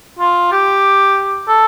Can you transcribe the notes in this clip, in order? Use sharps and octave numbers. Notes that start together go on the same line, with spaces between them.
F4
G4
A4